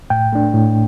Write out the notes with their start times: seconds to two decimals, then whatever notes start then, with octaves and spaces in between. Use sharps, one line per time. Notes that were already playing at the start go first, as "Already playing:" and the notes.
0.10 A2 G5
0.33 A3 D4
0.54 A2